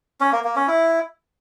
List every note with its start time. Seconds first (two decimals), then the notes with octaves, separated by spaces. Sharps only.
0.21 C#4
0.32 A#3
0.44 A#3
0.56 C#4
0.68 E4